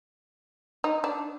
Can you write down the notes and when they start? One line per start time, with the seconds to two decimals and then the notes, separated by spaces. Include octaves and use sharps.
0.84 D#4
1.04 D4